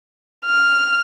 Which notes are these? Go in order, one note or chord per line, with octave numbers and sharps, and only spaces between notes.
F6